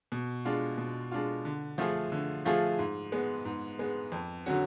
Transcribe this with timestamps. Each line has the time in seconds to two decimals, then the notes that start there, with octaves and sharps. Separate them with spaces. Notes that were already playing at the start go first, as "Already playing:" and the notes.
0.12 B2
0.45 G#3 D4 F4
0.78 B2
1.11 G#3 D4 F4
1.45 D3
1.78 F3 A3 F4 G#4
2.12 D3
2.45 F3 A3 F4 G#4
2.79 G#2
3.12 G#3 B3
3.45 G#2
3.79 G#3 B3
4.12 F2
4.46 D3 F#3 C#4 F#4